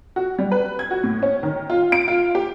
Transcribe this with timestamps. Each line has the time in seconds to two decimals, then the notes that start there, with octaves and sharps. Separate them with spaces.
0.16 F#4
0.39 G3
0.52 B4
0.79 G#6
0.91 F#4
1.03 A2
1.23 C#4
1.43 D#3
1.70 F4
1.92 D7
2.08 F4
2.35 G4